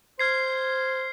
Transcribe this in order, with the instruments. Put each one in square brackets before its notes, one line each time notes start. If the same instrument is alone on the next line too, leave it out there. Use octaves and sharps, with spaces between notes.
[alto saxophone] C5 [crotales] F6 G#6 C7